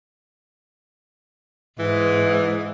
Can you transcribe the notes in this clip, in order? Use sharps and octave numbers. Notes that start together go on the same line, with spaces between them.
G#2 E3